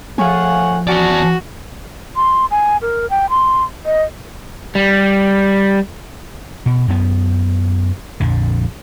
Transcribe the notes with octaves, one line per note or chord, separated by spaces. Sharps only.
F3 A3 F4 G#4 C#5 F#5 G#5
E2 C#4 D4 F#4 D5
C6
G#5
A#4
G5
C6
D#5
G3
B2
F#2 B3
A#1 F2 D3